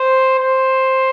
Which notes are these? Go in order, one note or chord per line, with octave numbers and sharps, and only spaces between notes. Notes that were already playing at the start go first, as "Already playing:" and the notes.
Already playing: C5
C5